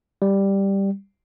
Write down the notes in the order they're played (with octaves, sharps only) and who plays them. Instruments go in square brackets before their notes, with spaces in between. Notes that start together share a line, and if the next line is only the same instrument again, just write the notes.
[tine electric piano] G3